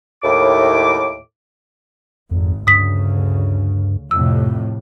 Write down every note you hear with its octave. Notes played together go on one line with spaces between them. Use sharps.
D#2 A2 D6
G#1 F2
D2 G2 C#3 D#6 B6
F2 A2 C3 E6